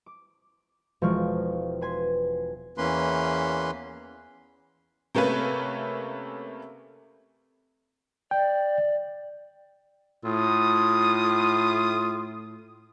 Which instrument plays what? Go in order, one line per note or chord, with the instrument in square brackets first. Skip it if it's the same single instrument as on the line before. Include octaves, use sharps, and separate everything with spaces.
[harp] D6
E1 F3 G#3 D5 C#6 F6
B4 G#5 C6
[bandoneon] E2 E3 A#3 C#4 B4 C6
[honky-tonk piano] C3 A3 A#3 C#4 B4
[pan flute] D5 [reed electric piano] G5
[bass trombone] A2 [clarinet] F4 [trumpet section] D#6